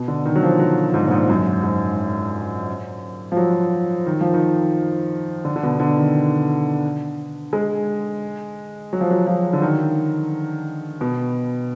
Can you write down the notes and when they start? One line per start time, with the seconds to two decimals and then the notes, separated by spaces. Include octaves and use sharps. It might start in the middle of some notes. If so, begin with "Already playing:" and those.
Already playing: B2
0.08 D3
0.26 D#3
0.36 F#3
0.43 F3
0.60 F#3
0.94 G#2
1.08 A#2
1.11 G#2
1.29 F#2
1.63 G#2
3.32 F3
3.37 F#3
4.06 D#3
4.21 F3
4.34 D#3
5.45 D3
5.56 D3
5.63 B2
5.80 D3
5.97 D#3
7.53 G#3
8.93 F#3
9.01 F3
9.11 F#3
9.27 F3
9.53 D3
9.62 D#3
11.01 B2